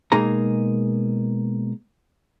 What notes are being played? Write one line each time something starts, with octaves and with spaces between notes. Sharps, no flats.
B2 G#3 A#3 D#4 G#4 A#5